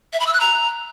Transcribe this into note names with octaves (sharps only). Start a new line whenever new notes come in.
E5
B5
E6
F#6
A#5